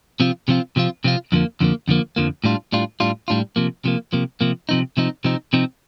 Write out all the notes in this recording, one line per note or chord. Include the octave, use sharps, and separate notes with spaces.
C3 F3 C4 F4
C3 F3 C4 F4
C3 F3 C4 F4
C3 F3 C4 F4
F2 D3 F3 A#3
F2 D3 F3 A#3
F2 D3 F3 A#3
F2 D3 F3 A#3
A2 G3 D4 F4
A2 G3 D4 F4
A2 G3 D4 F4
A2 G3 D4 F4
C3 F3 A#3
C3 F3 A#3
C3 F3 A#3
C3 F3 A#3
C3 F3 C4 D#4
C3 F3 C4 D#4
C3 F3 C4 D#4
C3 F3 C4 D#4